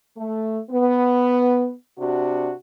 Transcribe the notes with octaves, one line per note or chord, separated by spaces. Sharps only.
A3
B3
C3 D4 F#4